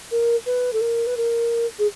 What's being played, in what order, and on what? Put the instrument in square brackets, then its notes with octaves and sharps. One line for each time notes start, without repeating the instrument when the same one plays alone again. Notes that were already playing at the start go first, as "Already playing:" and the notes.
[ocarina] A#4
B4
A4
A#4
B4
A#4
G#4